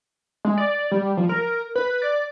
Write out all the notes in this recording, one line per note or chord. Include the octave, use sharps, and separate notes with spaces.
G#3
D5
G3
F3
A#4
B4
D5